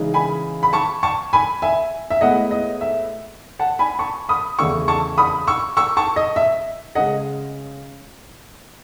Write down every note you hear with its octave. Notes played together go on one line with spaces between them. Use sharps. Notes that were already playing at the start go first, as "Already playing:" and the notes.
Already playing: C#3 E3 G#3 D#4
G#5 B5
B5
A5 C#6
A5 C#6
G#5 B5
E5 G#5
E5
A2 G#3 B3 E4 D#5 F#5
D#5
E5
F#5 A5
G#5 B5
A5 C#6
B5 D#6
E2 C#3 E3 A3 E4 C#6 E6
A5 C#6
B5 D#6
C#6 E6
C#6 E6
A5 C#6
D#5
E5
C#3 G#3 D#5 F#5